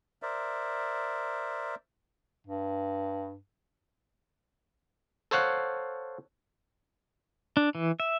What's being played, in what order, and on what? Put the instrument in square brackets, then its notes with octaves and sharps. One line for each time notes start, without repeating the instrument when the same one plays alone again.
[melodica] A#4 C5 D5 E5
[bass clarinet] G2
[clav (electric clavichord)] A4 C5 C#5 F5 F#5
[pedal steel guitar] D4
E3
E5